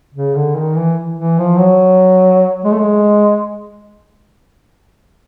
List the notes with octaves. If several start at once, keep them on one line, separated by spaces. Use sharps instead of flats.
C#3
D3
D#3
E3
E3
F3
F#3
G#3
A3
G#3